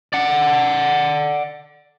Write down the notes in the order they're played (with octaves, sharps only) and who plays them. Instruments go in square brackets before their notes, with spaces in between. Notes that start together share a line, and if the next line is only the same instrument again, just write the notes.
[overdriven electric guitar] D5 F#5